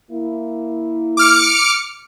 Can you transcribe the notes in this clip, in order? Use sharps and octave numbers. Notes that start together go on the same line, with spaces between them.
A#3 E4
D6 F6 C#7